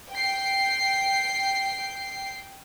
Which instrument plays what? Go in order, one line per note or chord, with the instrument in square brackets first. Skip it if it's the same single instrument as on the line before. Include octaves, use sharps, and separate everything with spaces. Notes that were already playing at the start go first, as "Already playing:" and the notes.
[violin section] G5 C7